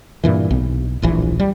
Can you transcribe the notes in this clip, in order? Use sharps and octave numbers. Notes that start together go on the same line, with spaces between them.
G2 A#2 E3
B1
D1 A#1 E3
G3